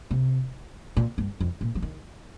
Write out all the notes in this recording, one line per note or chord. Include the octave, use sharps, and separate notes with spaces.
C3
A#2
G2
F2
A#2
F3
D#3